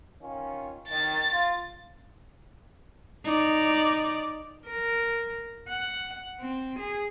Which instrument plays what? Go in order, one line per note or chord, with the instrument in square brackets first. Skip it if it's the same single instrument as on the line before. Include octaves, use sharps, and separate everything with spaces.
[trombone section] D#3 C#4 F4
[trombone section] D#3 [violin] A6
[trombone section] F4
[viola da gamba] D#4 D5
[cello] A#4
F#5
C4
G#4